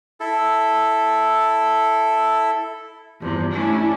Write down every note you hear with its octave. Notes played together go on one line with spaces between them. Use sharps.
E4 A4
E2 G2 C3 F3
A3 C#4 D4 E4